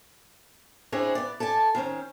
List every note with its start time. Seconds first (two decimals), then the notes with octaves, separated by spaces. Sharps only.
0.92 C4 D4 E4 G#4 C5 C#5
1.15 B3 D5
1.40 A4 D5 G#5 A5
1.75 D#3 C4 C#4